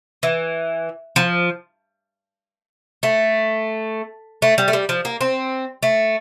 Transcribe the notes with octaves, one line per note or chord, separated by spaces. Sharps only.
E3
F3
A3
A3
G3
A3
G3
F3
A#3
C4
A3